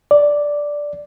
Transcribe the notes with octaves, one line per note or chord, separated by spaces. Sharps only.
D5